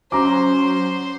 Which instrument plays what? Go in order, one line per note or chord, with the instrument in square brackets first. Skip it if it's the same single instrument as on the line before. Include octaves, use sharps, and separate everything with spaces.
[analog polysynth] F#3 C#4 [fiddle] C5 [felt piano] A#5 D6